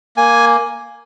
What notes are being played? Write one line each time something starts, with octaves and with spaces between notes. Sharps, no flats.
A#3 G#5